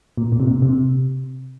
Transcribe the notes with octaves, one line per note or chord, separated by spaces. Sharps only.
A#2
A#2
C3
A#2
C3